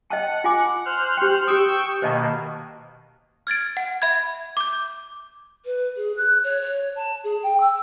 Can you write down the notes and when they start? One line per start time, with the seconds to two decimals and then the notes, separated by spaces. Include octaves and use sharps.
0.10 D#5 F#5 G5 A5
0.44 F4 G#5 D6
0.86 C5 F6 F#6
1.17 G4 G5
1.47 G4 G5 C#6 D#6 E6
2.02 B2 D#3 A#3 C5 D#5 A5
3.47 F6 G#6 A6 D7
3.77 F#5
4.02 E5 B5 G#6
4.57 D6 G6
5.65 B4
5.96 G#4
6.17 F#6
6.43 C#5
6.61 C#5
6.95 A5
7.23 G#4
7.43 G5
7.60 E6